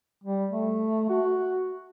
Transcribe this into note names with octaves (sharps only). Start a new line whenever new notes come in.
G3
A3
F#4